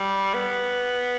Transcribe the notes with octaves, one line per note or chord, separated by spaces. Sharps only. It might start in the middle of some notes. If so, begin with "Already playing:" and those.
Already playing: G3
B3